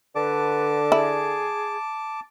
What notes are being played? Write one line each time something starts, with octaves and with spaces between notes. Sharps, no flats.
D3 B4 A5 D6
E4 G#4